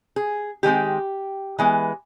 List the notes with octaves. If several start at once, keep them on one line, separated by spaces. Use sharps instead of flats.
G#4
D#3 G#3 C4 G4
E3 G#3 B3